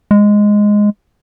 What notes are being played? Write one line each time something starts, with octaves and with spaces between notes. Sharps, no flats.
G#3